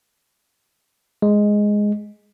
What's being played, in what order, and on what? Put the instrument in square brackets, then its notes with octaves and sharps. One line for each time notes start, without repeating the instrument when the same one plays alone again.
[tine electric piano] G#3